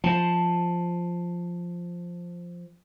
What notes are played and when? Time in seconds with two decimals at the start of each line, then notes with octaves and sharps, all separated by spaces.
0.04 F3 C5 A5